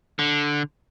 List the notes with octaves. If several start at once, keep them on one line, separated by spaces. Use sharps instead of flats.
D3